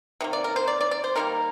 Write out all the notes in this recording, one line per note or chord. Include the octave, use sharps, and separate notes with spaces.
C3 D#3 A#3
D5
A#4
C5
D5
D5
D5
C5
D#3 G3 A#3 A#4